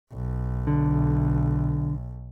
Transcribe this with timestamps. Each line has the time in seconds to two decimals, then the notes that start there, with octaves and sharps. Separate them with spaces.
0.12 B1
0.67 D3